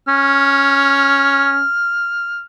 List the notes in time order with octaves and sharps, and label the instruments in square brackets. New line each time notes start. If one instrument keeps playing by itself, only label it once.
[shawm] C#4 [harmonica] F6